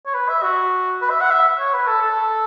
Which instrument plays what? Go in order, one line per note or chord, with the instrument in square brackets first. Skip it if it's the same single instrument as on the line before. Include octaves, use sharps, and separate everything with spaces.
[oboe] C#5
B4
E5
F#4
B4
E5
F#5
E5
C#5
B4
A4
A4